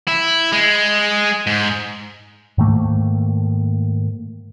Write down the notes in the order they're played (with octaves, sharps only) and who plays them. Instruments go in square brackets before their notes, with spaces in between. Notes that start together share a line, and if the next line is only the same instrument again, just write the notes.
[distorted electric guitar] E4
G#3
G#2
[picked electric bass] G#2 D#3 A3 A#3